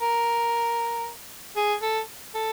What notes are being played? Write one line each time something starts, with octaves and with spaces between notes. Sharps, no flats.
A#4
G#4
A4
A4